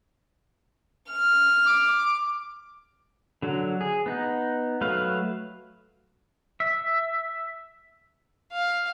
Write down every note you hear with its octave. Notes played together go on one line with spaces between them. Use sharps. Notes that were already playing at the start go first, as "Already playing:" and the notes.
F6
D6
D3 F#3
G#4
B3 D#4
F#3 A3 B4 F5
E5
F5